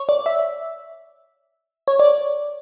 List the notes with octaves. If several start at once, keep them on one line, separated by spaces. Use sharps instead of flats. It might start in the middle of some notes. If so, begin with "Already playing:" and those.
Already playing: C#5
D5
E5
C#5
D5